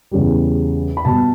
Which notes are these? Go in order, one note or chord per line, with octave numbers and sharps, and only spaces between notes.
E2 C#3 G3
B5
B2 G3 A5